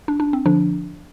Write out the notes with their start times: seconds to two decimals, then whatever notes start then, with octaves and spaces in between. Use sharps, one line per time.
0.08 D4
0.20 D4
0.33 C4
0.46 D3 F3 D4